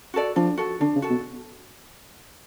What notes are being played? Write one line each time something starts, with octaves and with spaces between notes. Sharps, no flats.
F#4 A4 D5
F3 D4
F#4 A4
D3 D4
C#3
F#4 A4
B2